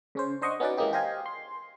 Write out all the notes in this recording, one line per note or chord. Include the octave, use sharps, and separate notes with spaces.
C#3 C#4 C5
D4 C5 D#5 F#5 C#6
B3 C#4 D#4 F#4 B4 D5
E3 G#3 A#3 C#4 D#4 G4
G4 C5 D#5 F5 G#5
C6